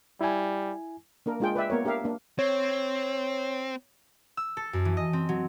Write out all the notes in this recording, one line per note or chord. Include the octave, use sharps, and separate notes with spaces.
G3 E4 G#5
A#3 D4 A#4
G#3 D4 F4 G#4 G5
B4 D5 E5 G5
A#3 B3 A#4 C#5
D4 G4 A#4 E5 F5
A#3 D4
C4 C#5
E6
A4
F#2
E3
D#5
C4
F#3